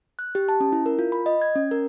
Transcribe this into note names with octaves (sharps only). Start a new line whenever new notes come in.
F#6
G4
A5
C#4
E4
A#4
F4
B5
D#5
G#6
C#4
A#4